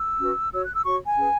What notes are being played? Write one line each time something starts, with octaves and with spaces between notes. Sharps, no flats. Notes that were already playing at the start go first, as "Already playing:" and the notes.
Already playing: E6
C#4 F#4 B4
F#4 C#5 E6
F#6
E6
F#4 C#5 C#6
G#5
C#4 G#4 B4